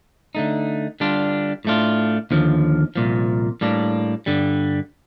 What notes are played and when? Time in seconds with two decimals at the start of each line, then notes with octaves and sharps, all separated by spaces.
0.35 D3 A3 D#4
1.00 D3 G3 D4 F4
1.65 A2 A3 D4 F4
2.31 D#2 D3 F3
2.96 C2 A#2 F3
3.61 A2 G3 A#3 D4
4.26 G2 D3 G3